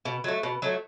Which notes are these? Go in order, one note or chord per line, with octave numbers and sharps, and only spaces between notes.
B2
F#3 A3
B2
F#3 A3